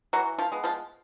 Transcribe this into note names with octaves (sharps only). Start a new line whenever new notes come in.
E3 F#3 F#4
F3 F4
G#3 B3
F3 F4